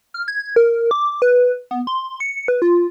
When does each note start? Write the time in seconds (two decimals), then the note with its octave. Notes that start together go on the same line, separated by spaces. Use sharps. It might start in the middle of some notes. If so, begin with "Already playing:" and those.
0.14 F6
0.28 G#6
0.56 A#4
0.91 D6
1.22 B4
1.71 B3
1.87 C6
2.20 C#7
2.48 B4
2.62 F4